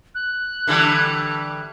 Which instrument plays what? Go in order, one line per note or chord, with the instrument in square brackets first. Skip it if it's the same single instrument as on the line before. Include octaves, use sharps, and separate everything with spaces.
[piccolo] F#6
[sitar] D3 E3 G3